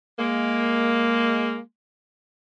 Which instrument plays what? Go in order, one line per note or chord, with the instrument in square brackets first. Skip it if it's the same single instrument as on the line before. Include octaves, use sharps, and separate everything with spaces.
[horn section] G#3 A#3